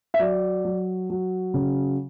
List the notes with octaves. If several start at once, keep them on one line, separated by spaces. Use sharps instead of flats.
E5
F#3 D5
F#3
F#3
C#3